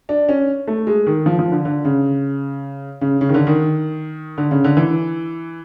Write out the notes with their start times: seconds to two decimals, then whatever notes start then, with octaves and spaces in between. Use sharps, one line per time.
0.09 D4
0.29 C#4
0.68 A3
0.87 G#3
1.06 D#3
1.26 F3
1.39 F3
1.52 D3
1.65 D3
1.85 C#3
3.01 C#3
3.21 C#3
3.29 D#3
3.34 D3
3.47 D#3
4.38 D3
4.51 C#3
4.64 D3
4.77 E3